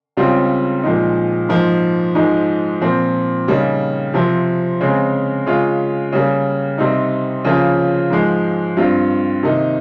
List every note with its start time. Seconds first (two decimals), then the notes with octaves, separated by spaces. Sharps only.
0.17 C#2 C#3 G3 C4 F4
0.83 A#2 F3 G#3 D#4
1.49 G#2 F3 A#3 D#4
2.15 G#2 F3 G#3 D#4
2.81 A#2 F3 C4
3.48 C#3 G3 A#3 D#4
4.14 C3 F3 C4
4.81 C#3 G#3 C4
5.46 C#3 G#3 C#4 F4
6.12 C#3 G3 A#3
6.78 C3 G3 C4 D#4
7.45 C#3 F3 A#3 C#4 F4
8.10 G#2 F3 G#3
8.77 G2 G3 C4 F4
9.43 C3 D#3 A#3 D#4